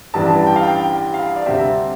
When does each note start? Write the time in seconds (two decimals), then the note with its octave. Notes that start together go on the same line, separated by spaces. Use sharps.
0.14 A1 G2 E3 G3 D4 A5
0.30 A5
0.47 G5
0.56 F5
0.63 G5
0.80 G5
1.14 F5
1.36 D5
1.46 D2 C3 G3 C4 E5